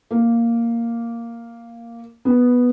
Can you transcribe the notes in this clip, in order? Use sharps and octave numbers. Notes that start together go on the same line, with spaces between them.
A#3
B3